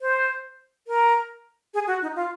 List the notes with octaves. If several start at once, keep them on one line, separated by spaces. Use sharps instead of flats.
C5
A#4
G#4
F#4
D#4
F4